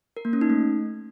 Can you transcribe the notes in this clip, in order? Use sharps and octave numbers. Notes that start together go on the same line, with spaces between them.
A#4
A#3
C#4
D#4
A3